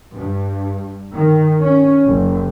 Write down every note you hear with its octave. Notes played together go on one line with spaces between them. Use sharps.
G2
D#3
C#4
F#1